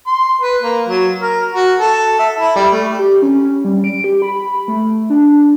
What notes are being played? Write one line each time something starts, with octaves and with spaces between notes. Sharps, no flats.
C6
B4
A#3
F#3
A#4
F#4
A4
E5
E4
G3
A3
G4
C#4
C#4
G3
D7
G4
B5
A3
D4